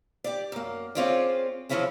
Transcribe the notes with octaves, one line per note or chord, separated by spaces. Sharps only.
G4 D5
F#2 A#3
C4 C#4 F4 G#4 D5
E3 F3 C4 C#4 E4 G#4